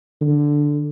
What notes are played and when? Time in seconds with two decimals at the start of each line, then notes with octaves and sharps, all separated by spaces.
0.22 D3